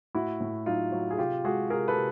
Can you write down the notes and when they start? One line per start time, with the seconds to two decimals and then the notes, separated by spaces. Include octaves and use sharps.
0.15 A2 E4 F#4
0.40 A2
0.66 F#3 D#4 F4
0.92 F#3
1.11 G#4
1.18 C3 F4 G4
1.44 G#3 F#4 G#4
1.70 C3 G#4 A#4
1.88 A4 B4
1.96 C3